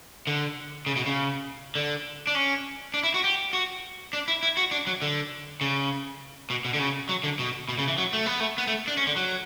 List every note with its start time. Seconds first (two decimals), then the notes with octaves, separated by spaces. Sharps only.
0.27 D3
0.86 C#3
0.96 B2
1.06 C#3
1.76 D3
2.27 D4
2.35 C#4
2.94 D4
3.03 E4
3.14 F#4
3.24 G4
3.53 F#4
4.13 D4
4.28 E4
4.43 E4
4.57 F#4
4.71 D4
4.87 F#3
5.02 D3
5.61 C#3
6.50 B2
6.65 B2
6.74 D3
6.79 C#3
7.09 F#3
7.24 D3
7.39 B2
7.69 B2
7.78 C#3
7.88 E3
7.98 F#3
8.13 A3
8.26 B3
8.40 A3
8.58 B3
8.67 A3
8.88 D4
8.97 C#4
9.07 D3
9.17 F#3